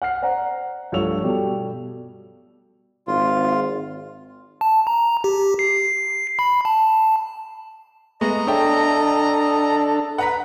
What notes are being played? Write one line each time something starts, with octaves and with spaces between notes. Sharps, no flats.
F#5 F6 C7
C5 D5 F#5 A#5
G2 F3 A3 C#5 E6 F7
B2 G3 G4 A4
G#1 F4
A5
A#5
G4
C7
B5
A5
G#3 A3 B3 D#5 A#5
D4 A4 C#5 E5 G5
B4 F#5 A#5 B6